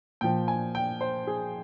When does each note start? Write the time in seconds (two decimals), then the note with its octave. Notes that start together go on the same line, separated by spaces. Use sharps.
0.21 A#2 F3 G5
0.48 G#5
0.75 G5
1.01 C5
1.27 G#4